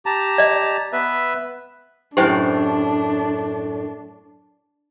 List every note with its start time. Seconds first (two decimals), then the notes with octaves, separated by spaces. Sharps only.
0.06 G4 A5 A#5
0.38 D5 D#5
0.93 B3 B4 E5
2.17 F#2 A2 D4 G4 C5 G5